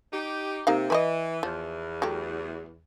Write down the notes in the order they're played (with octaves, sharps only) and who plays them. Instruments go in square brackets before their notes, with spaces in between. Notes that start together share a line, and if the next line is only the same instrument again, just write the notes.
[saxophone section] D#4 G4
[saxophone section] C3 [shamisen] A#3 D#4 F5
[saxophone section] E3 [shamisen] B4 C5 D#5
[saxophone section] E2 [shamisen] F3
[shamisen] F#3 A3 G4